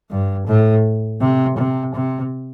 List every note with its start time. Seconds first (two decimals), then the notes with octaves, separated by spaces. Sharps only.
0.10 G2
0.47 A2
1.20 C3
1.57 C3
1.94 C3